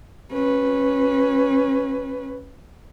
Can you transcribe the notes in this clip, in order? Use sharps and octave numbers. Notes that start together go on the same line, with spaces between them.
C#4 B4